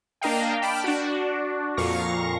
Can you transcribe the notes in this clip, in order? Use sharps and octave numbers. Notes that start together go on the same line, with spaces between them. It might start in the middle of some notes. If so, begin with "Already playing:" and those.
A#3 D4 A#4 D#5 F5 G5
G5 A5 B5 D6 F6 D7
D4 F#4
F2 A#2 F5 C#6 A#6